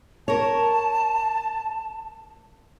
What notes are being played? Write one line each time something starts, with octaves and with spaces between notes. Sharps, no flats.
A#4 C#5 A5